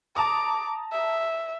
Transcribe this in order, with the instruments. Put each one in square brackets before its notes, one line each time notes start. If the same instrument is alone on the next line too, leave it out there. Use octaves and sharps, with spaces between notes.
[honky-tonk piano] A5 A#5 D#6 [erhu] D6
[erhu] E5